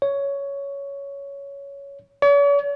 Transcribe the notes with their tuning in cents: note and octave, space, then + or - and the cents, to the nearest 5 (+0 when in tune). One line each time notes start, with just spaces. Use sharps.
C#5 +10
C#5 +45